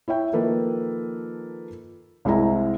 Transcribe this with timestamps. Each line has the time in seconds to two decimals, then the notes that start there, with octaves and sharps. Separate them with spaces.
0.08 E4 C#5 E5 G5
0.33 D#3 F3 A#3 A4 B4
2.25 C2 G#3 C4 E4 A#5